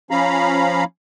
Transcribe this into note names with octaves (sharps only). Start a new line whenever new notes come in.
F3 C#4 F5 A#5 B5